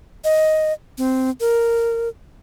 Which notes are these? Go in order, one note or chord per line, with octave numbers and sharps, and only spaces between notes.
D#5
C4
A#4